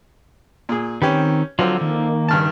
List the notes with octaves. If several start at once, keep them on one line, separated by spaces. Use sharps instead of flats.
A#2 G#4
D#3 C4 C#4 G4 B4
D3 F3 F#3 C4 F4
D#3 A#3
G2 C#3 A5